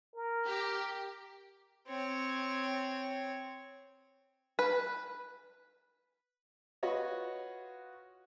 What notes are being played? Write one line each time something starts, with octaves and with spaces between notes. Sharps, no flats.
A#4
G4
C4 C#5
B4
F4 F#4 B4 C#5 D#5